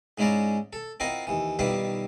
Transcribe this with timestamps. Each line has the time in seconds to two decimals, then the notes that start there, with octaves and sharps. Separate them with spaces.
0.18 G#2 G#3 C#4 E4 D5 A#5
0.73 A4
1.00 C4 E4 F4 A#4 D#5 F#5
1.27 D#2 E3
1.59 B1 D#3 G3 E4 F4 B4